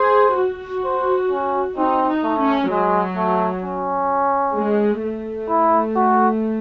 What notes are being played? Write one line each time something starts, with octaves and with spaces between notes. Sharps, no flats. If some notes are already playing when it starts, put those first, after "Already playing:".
Already playing: G#4 C5
F#4
C5
C#4
C4 D#4
D#4
A3
C#4
F#3 G#3
A3
C#4
G#3
A3
E4
F#4